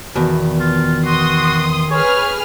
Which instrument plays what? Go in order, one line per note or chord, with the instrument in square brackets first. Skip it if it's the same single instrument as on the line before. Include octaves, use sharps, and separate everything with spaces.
[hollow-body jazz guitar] E2 B2 [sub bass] D#3
[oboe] F4
[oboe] F#4 [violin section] C6 D#6
[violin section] G#4 B4 F6 [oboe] C#5